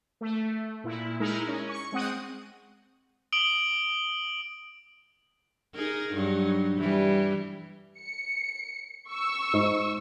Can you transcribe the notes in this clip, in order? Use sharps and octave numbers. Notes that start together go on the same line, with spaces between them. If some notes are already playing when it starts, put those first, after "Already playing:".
A3
A#2 E4
G#3 D#4 E4 A#4
C#4
C#6
G#3 C4 F#5 D#6
D#6 D7 F#7 G7
D#4 G#4 A#4
G2 F#3 D#4
E3 G3
C#7
C#6 E6
G#2